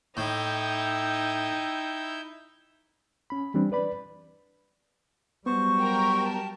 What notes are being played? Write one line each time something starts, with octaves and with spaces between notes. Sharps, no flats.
A2 D#4 E4 G5 E6 G6
C#4 B5
E3 G3 C4 D4
B4 D5 B5
F#3 G3 B3 F#4 C5 C#6
G4 A#4 G5
A5